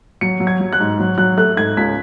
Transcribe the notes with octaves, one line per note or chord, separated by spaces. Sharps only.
F#3 C#7
F#3
G#6
F#3
F#6
G#2
F#3
F#3 F#6
A3 F#6
G#2 G#6
C#2 B6